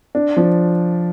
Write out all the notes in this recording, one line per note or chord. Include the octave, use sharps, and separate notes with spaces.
D4
F3